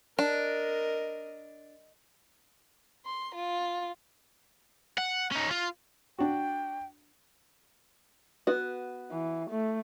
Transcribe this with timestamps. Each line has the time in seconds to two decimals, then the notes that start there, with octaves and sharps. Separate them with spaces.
0.19 D4 A#4 D#5
3.06 C6
3.35 F4
4.98 F#5
5.32 C#4 D#4
5.50 F4
6.19 D4 F#4 G5
8.47 B3 F#4
9.11 E3
9.50 A3